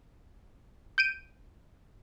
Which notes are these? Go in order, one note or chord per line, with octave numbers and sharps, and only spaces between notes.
G6 D7 D#7